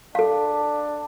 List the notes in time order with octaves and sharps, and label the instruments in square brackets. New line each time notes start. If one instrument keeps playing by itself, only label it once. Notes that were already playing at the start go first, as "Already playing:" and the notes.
[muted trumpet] D4 [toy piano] A4 F5